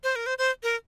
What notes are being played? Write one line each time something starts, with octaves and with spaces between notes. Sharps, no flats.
C5
A#4
C5
C5
A#4